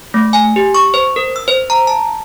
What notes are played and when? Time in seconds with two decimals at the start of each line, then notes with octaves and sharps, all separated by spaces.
0.14 A3
0.33 G#5
0.56 G4
0.75 C#6
0.94 C5
1.16 A#4
1.36 E6
1.48 C5
1.70 A#5
1.87 A5